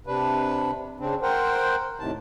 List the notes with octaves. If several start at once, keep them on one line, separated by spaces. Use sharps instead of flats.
C3 D4 B4
C#3 C4 D4
A#4 C5 F#5 G5
A2 C3 D#3 A5